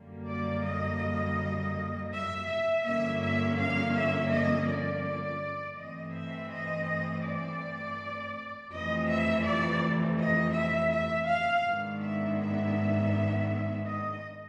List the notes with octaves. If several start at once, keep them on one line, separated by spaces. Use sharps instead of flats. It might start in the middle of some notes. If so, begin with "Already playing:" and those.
Already playing: F#2 D3 G3 A#3
D5
D#5
E5
E5
G2 D3 F3 A#3 C#4 E5
E5
F5
E5
D#5
D5
G2 E3 A3 C4 D#5
E5
D#5
D5
F2 C3 E3 A3 C4 D#5
E5
D5
D#5
E5
E5
F5
G#2 D#3 G#3 B3 D4
E5
E5
D#5